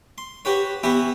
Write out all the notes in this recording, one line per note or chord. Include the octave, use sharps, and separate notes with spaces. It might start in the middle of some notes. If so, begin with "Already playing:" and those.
C6
F#4 G4 B4 C#5
E3 B3 E4 F#4 G4